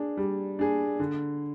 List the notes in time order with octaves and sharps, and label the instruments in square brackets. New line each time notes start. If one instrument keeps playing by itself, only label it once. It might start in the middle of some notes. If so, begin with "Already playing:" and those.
Already playing: [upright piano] D4 G#4
G3
D4 G#4
D3